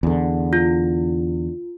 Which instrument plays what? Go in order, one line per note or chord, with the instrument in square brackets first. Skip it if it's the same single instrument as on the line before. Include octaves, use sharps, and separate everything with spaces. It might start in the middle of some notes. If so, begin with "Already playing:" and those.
[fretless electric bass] E2 D3
[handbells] F4